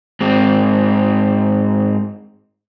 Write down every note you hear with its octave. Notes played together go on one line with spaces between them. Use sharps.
G#2 C4